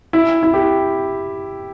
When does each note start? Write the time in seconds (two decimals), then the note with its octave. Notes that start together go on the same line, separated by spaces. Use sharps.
0.13 E4
0.43 E4
0.54 G4